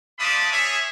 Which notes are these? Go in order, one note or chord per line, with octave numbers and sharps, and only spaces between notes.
A3 D4 F4 D5 B5 D#6
G#4 C#5 E5